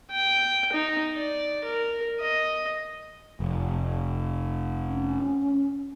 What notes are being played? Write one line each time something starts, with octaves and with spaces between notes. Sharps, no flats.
G5
D#4
D5
A#4
D#5
F1
C#4